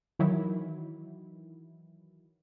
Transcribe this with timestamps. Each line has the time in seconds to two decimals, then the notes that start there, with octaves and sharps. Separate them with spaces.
0.19 D#3 E3 F#3 E4